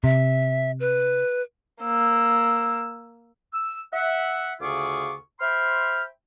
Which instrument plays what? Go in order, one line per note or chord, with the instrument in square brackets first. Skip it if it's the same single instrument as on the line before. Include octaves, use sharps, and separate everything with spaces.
[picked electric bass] C3 [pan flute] E5
[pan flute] B4
[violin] A#3 E6
[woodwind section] E6
E5 F#5
D2 C#3 F4 G#4 C#6 D6
C5 E5 G5 B5 C6 F6